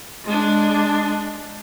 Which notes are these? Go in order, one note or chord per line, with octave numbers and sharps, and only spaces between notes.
G#3 D4